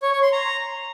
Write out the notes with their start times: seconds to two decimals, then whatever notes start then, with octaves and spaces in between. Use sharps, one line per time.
0.02 C#5
0.12 C#5
0.22 C6
0.32 A#5